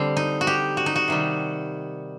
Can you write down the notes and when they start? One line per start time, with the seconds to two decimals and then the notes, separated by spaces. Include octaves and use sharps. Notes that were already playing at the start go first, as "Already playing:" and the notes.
Already playing: D3 G3 C4
0.17 D#4
0.41 F#4
0.47 G4
0.77 F#4
0.86 D#4
0.96 F#4
1.08 C3 D#3 G3